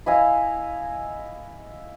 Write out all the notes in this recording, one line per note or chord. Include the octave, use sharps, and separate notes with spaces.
E4 D#5 F5 G#5